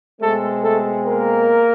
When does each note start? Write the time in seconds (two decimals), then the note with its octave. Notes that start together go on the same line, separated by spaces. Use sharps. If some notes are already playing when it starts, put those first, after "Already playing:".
0.19 B2 G#3 A3 C4 A4
0.63 A3 A4
1.06 A#3 A#4